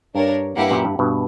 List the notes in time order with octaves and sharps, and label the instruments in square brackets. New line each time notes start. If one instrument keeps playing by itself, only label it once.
[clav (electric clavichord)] G2 [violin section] D4 A#4 C#5
[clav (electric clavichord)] G2 [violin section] A#3 E4 G4 B4 F#5
[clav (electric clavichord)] F#2 A#2
G2
G2 B2